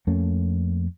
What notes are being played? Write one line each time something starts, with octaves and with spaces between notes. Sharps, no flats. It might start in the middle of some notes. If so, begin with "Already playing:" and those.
F2 A3 A#3 C#4